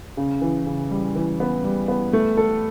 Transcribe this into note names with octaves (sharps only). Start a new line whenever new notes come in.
C#3
E3
C#3
G3
E3
B3
G3
B3
A3
A4